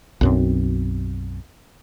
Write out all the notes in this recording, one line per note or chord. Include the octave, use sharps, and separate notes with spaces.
B1 F#2 C4